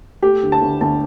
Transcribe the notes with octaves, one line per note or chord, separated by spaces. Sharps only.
A3 G4
D2
A5
D2
D2 A5